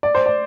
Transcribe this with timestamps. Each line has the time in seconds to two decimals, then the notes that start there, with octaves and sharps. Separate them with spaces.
0.03 D5
0.15 C5
0.26 D5